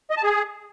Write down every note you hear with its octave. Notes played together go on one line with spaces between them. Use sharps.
D#5
A5
G#4